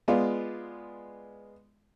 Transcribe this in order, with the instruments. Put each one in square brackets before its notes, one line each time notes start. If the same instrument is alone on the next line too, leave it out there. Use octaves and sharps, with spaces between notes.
[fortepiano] G#3 B3 F4 D5